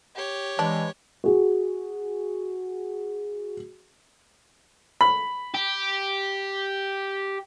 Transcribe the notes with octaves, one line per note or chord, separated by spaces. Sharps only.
G4 C#5
E3 G#3 D4
F#4 G#4
B5
G4